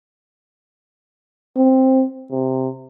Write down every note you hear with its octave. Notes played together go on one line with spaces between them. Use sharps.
C4
C3